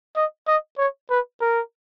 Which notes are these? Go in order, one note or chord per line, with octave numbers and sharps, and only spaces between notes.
D#5
D#5
C#5
B4
A#4